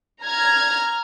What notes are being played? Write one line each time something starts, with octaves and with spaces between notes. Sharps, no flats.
A#5 F6 G#6